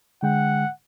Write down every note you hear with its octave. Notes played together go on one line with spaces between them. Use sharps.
D3 G#3 F#5 G5